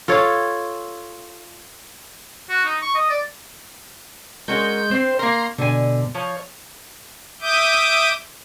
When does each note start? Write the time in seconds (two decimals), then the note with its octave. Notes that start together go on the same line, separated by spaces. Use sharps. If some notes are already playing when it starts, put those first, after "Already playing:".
0.08 F4 A4 C#5
2.49 F#4
2.65 D#4
2.82 C#6
2.95 D#5
3.09 D5
4.48 G#3 C#4 F#4 A#4 G6
4.91 C4 C5
5.19 A#3 A#4 A#5 C6
5.58 B2 D3 G#5
6.15 F3 C#5
7.41 E5 D6 D#6 G6